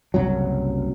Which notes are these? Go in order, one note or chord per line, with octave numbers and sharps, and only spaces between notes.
F#1 C2 F#3